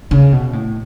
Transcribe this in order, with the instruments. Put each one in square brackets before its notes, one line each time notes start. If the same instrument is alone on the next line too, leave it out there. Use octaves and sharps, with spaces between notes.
[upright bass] C#3
B2
A2